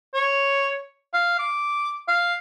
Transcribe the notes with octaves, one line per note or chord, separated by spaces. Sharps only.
C#5
F5
D6
F5